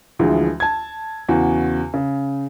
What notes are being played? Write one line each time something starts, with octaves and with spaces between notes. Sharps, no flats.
D2 E3 F3 G#3
A5 G#6
E2 C#3 F#4
C#3